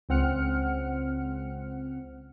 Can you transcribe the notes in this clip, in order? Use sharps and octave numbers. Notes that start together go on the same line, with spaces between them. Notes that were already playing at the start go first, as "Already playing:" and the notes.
C#2 C4 F#5 F6 C#7